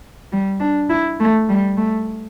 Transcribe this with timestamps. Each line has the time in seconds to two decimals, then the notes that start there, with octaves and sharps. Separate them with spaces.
0.32 G3
0.60 D4
0.90 E4
1.20 A3
1.49 G3
1.77 A3